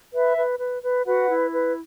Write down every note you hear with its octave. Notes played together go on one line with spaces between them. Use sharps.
B4 E5
B4
B4
B4
F#4 B4 F#5
E4
B4